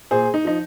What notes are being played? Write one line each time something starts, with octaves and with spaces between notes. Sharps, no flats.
A#2 G#4 C5
D#4
F3 D#4